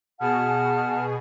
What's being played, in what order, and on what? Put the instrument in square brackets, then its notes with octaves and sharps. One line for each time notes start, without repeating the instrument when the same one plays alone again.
[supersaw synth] B2 G#4 [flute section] F#5 A5 F6